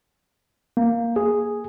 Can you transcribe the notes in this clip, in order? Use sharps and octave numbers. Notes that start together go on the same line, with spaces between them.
A#3
G#4